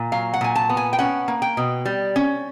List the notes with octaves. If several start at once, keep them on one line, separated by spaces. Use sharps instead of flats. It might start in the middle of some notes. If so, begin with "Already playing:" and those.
Already playing: A#2
F#3 F5
F#5
A#2 G#5
A5
B3
G#5
G5
C#4 F#5
A#3
G5
B2
G3
C#4